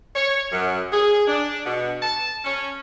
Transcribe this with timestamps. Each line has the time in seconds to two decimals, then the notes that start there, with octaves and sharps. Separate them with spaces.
0.16 C#5
0.53 F#2
0.93 G#4
1.28 D4
1.66 B2
2.02 A5
2.45 C#4